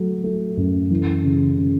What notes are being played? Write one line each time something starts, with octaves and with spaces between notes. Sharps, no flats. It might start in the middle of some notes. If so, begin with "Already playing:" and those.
Already playing: F#3 A3
A3
F#2
E3
C#3
C#3